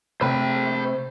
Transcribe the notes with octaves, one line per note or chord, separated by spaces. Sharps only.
C3 A3 C5 G5 B5